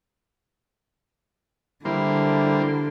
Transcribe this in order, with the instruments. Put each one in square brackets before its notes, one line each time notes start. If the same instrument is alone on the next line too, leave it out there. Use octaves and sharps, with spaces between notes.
[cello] D3 [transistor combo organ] G3 A#3 C5 [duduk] E4